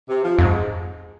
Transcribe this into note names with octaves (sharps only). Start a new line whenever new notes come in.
C3
F3
F2 G#2